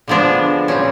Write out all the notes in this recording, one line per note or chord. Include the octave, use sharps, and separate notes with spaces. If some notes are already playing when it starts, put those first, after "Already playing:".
D3 F3 G#3 B3 D4
A#2 G3 C4 C#4